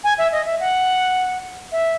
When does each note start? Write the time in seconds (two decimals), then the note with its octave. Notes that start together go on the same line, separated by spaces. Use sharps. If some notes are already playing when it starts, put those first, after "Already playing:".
0.04 G#5
0.18 E5
0.32 D#5
0.46 E5
0.60 F#5
1.72 E5